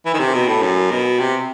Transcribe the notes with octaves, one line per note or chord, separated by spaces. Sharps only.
E3
D#3
C3
B2
A2
F#2
B2
C3